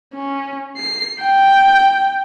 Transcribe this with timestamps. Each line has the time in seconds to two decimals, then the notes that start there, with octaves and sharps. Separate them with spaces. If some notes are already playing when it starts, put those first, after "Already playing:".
0.14 C#4
0.77 C7
1.22 G5